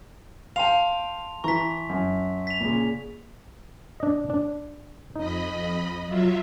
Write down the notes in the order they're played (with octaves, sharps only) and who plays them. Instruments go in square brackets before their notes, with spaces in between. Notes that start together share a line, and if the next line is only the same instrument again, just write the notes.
[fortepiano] F5 G5 [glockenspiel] A5 C6 F7
[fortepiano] E3 A#5 [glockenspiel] C#6 B6
[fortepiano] F#2
[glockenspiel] B6 F7
[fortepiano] A#2 C#3
[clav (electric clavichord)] D4 D#5
D4
[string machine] F2 D#5 B5 [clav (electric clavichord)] D#4
[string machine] F#3 F4 E5